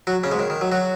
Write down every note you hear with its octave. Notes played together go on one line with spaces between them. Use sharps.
F#3 F#4
C#3 C#4
G#2 G#3
D#3
D#3
F#3
F#3 F#4